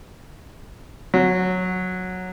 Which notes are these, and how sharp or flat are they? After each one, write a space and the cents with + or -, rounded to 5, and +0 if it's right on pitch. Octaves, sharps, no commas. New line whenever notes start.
F#3 -10